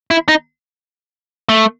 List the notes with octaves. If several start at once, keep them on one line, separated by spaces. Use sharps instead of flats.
E4
D#4
A3